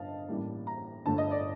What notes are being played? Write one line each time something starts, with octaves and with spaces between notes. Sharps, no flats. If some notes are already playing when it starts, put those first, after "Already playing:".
Already playing: G1 G2 D3 D#5 F5 A5
A1 A2 G3 A#3
A#5
G1 G2 D3 A3 A5
D#5
D5